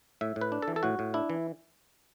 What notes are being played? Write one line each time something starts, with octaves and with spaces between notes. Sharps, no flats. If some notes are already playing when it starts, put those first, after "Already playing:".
A2 E5
A2
B4
D4
A4
E3
A4
A2 F#4
A2
D4 E4
E3